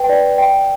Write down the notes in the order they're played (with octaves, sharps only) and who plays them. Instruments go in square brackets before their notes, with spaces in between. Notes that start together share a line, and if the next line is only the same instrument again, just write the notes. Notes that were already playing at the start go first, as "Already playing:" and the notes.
Already playing: [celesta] B4 G5
D5
G5